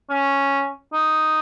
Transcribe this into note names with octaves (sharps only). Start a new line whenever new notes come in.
C#4
D#4